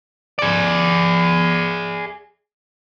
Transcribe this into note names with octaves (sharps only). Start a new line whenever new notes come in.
G#4 D5